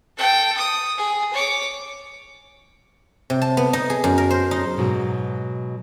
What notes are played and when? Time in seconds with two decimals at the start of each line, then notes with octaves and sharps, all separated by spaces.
0.17 A4 G5
0.57 D#6
0.98 G#4
1.33 C#5 D6
3.30 C3
3.41 A5
3.57 B3
3.73 D#4
3.90 G#4
4.04 F#2
4.18 A#4
4.31 C5
4.51 D#4
4.78 G#2 B2 F#3